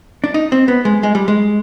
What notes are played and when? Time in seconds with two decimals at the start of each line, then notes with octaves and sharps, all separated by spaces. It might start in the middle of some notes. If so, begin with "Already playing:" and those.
0.24 D4
0.34 D#4
0.52 C4
0.68 B3
0.85 G#3
1.03 G#3
1.15 G3
1.28 G#3